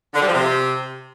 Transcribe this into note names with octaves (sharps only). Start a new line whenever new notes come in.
D3
G3
F3
C3